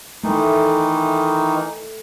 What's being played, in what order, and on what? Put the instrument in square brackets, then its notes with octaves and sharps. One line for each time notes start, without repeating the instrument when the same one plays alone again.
[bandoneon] D#3 E3 D#4 [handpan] A3